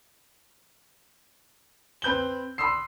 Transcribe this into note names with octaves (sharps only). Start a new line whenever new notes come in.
C4 B4 G6 F#7 G7
B5 C6 D#6 E6 C7